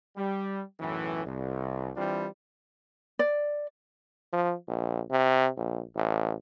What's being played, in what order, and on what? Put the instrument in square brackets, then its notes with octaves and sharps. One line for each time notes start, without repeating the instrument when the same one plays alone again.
[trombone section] G3
B1 F#2 A2 E3
C2
E3 G3 C4 D4 F4
[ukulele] D5
[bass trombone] F3
A#1
C3
A#1
A1